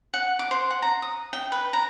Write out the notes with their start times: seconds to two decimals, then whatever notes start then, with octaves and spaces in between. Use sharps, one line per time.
0.14 F#5
0.39 D6
0.51 C5
0.70 F#5
0.82 A#5
1.02 D#6
1.33 G5
1.52 B4
1.73 A#5